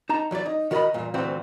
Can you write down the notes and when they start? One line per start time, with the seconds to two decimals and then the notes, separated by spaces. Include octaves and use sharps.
0.09 D#4 A5 A#5
0.31 E2 F#3 E4 D5
0.46 D#4
0.71 D#3 F#4 A#4 D5 D#5 B5
0.94 E2 G2 A#2
1.14 D2 A#2 E3 C4 F#4 C5